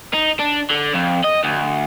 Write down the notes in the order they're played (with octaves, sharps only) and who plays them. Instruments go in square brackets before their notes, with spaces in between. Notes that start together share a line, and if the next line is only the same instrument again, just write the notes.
[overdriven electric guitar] D#4
D4
D3
F2
D#5
D2